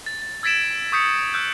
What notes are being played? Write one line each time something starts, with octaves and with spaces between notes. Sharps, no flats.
A6
A6
E6 G#6 A6 B6 D7 E7
C#6 D#6 G6 B6 C#7
E6 F#6 G6